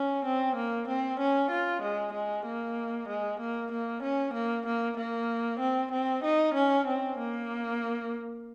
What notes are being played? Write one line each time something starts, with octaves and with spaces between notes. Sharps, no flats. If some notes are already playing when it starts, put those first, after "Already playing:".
Already playing: C#4
C4
A#3
C4
C#4
F4
G#3
G#3
A#3
G#3
A#3
A#3
C#4
A#3
A#3
A#3
C4
C4
D#4
C#4
C4
A#3